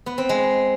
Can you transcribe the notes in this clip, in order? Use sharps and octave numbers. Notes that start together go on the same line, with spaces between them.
B3
C4
G#3